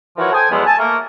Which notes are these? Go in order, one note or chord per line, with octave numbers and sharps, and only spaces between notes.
E3 F3 E4 F#4 A#4 C#5
A4 C5 G5 G#5
E2 F3 F#3 G#3 B3 A4
G#5 A5
A3 A#3 A#4